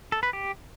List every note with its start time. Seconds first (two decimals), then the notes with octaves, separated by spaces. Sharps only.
0.12 A4
0.23 B4
0.33 G4